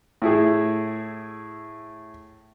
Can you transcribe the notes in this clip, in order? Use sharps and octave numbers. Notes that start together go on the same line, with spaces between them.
A2 E4 G#4